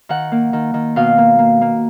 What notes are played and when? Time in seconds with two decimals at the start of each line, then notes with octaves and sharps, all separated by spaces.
0.09 D#3 F#5
0.32 A#3
0.53 D#3
0.74 D#3
0.96 B2 F5
1.18 A#3
1.39 A#3
1.61 A#3